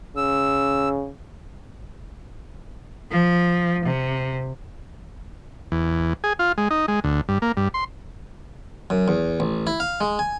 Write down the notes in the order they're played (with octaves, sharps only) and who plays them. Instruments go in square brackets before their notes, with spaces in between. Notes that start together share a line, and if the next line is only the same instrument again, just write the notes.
[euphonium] C#3 [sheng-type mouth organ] E6
[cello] F3
C3
[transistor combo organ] E2
G#4
F4
G#3
D#4
G#3
D2
G2
A#3
G2
C6
[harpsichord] F#2
E2
A1
E4
F5
G#3
G#5